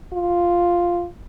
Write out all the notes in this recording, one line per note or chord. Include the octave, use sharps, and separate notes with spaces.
F4